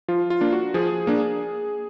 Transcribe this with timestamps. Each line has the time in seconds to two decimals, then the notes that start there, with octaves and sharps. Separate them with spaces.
0.08 F3 F4
0.30 F4
0.41 A#3 D4
0.52 F#4
0.74 F3 G#4
1.07 A#3 D4